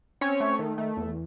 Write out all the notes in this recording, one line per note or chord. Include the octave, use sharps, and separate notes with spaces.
C4 C#4 C#5
A3
D#3
A3
E2